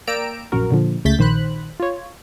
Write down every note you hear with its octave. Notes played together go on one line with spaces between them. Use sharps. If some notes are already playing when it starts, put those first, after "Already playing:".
A#3 D5 G5 A#5 E6 D7
A#1 F#2 F#4 A#4
A#2 D3 F3
C#2 C#3 A3 G6 A6 B6
A#1 D#3 C5 B5 F#6
F4 C#5